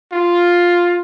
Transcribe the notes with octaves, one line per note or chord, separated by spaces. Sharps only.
F4